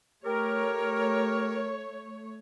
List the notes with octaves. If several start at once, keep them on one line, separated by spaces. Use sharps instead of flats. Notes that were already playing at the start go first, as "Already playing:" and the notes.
A3 G4 A#4 C#5